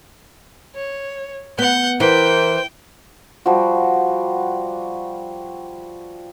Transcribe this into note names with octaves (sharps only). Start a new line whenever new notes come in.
C#5
B3 F#5 G6
E3 A#4 C5 G5
F3 G3 F#4